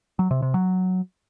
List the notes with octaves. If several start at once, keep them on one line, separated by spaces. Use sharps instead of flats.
F#3
C3
C3
F#3